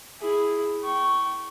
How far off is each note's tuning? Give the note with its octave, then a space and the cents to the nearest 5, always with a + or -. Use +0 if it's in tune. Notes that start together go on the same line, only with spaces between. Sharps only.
E4 +0 G#4 +0
G5 -30 C#6 +0